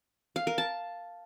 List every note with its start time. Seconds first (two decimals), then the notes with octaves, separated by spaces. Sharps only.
0.36 F5
0.47 A#4
0.58 A5